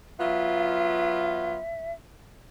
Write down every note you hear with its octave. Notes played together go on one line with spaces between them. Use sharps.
F#3 B3 F4 E5